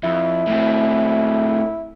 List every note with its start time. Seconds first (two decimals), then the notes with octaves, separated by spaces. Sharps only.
0.04 F2 E4
0.47 A2 C4